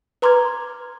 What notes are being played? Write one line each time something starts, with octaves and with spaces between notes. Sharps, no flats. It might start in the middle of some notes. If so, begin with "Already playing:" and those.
B4 A#5 C6 D6 F6 G#6